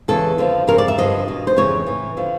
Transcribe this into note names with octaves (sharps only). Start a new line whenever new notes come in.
E2 C#3 E3 A4
F2 D3 F3
F2 C#3 F3 A#4
D5
E5
G2 D3 F3 D#5
E2 B2
C5
F2 C#3 E3 C#5
A2 E3
D3 F3